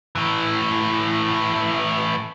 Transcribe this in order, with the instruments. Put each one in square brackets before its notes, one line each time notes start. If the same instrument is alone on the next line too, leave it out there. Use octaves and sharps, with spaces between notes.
[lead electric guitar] A2 E3